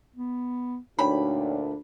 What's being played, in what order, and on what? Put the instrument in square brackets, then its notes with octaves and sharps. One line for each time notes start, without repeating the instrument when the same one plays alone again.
[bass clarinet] B3
[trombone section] D2 A#2 [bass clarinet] D4 [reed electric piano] D#4 C#5 G5 [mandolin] B5